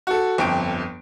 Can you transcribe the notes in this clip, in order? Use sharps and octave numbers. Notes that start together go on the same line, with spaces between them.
F#4 A4
G1 F2 G5 D7